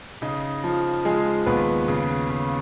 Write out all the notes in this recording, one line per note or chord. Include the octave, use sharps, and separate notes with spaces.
C#3 D#4
F3
F3 G#3 G#4
D#2 B3 B4
C#3
C#3